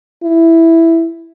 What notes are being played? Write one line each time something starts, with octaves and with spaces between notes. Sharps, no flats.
E4